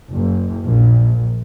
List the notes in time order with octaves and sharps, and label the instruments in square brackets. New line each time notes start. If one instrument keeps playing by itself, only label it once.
[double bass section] F#1
A#1